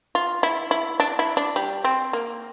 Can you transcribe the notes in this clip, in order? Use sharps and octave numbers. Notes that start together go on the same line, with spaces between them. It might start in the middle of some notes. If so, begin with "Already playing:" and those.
F4
E4
E4
D4
E4
D4
G3
C4
A#3